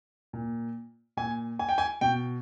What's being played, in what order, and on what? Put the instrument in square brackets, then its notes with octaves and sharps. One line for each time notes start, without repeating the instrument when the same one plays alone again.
[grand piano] A#2
A#2 G#5
G#5
G5
G#5
B2 G5